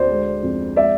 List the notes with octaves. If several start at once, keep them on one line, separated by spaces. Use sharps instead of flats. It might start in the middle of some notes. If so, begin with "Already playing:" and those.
Already playing: D2 C5 D5
G#3
F2
G#3 D5 E5